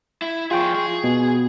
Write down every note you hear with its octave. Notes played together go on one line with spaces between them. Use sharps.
E4
F3 F4 G#4 G5 C#6
G#4
B2